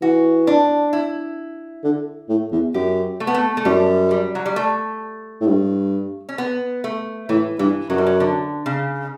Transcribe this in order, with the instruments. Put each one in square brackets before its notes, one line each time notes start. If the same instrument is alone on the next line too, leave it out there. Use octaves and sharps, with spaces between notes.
[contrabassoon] E3 [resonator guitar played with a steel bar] F#4
[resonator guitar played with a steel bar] D4
E4
[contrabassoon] D3
A2
E2
[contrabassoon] F#2 [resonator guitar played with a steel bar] G4
[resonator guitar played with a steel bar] A3
B3
A3
A3
[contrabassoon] F#2 [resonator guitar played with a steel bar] G3
[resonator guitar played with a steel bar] G3
F#3
G3
A3
[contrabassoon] A2
G2
[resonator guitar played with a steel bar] C#4
B3
A3
[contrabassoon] A2 [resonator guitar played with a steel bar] E3
[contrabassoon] G2 [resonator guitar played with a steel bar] E3
[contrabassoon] F#2 [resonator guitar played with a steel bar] F#3
[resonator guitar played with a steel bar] G3
F#3
D3
C#3